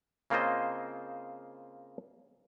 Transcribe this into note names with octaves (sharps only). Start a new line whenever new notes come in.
C#3 A#3 C4 F4 C5 D#5